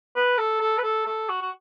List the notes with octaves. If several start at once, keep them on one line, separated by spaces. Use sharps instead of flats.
B4
A4
A4
B4
A4
A4
F#4
F#4